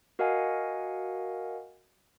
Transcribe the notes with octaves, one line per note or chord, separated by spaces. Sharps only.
F#4 A#4 D#5 F5 F#5 G#5